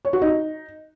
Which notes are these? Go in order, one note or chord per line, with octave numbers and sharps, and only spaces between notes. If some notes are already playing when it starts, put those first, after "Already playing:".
C#5
F#4
D#4